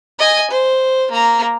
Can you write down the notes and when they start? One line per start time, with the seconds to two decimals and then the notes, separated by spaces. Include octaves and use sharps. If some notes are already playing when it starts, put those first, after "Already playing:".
0.19 D#5 G#5
0.51 C5
1.11 A#3 A#5